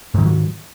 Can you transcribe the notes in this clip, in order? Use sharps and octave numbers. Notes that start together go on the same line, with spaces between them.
G#2 D#3 E3 F#3